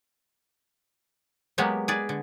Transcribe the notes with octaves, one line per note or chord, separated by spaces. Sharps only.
F#3 G#3 A#3 B3 G4
G#4 B4 D5
D3